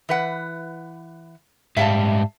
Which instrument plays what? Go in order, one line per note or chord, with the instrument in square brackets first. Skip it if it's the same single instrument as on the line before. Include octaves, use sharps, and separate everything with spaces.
[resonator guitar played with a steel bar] E3 B4 F#5
[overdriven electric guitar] G#2 G3 [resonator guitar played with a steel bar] E5 F5 A5